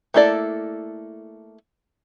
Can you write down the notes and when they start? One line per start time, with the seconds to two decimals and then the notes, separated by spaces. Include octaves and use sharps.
0.14 A3 A#3 E4 A4 D5